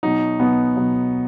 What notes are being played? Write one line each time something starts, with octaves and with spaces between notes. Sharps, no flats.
B2 F#3 D#4
B2 F#3 B3
B2 F#3